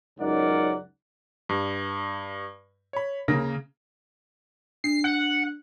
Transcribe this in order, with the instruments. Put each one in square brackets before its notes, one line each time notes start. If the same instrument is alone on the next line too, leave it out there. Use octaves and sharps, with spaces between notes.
[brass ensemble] C#2 F#2 D#4 A#4 D5 F#5
[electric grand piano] G2
C#5 B5
[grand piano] C#3 [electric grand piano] A#3 A#4 A#6
[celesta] D4 [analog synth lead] C7
[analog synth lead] F#5